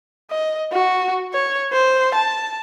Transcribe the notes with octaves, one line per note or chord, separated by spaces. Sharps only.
D#5
F#4
C#5
C5
A5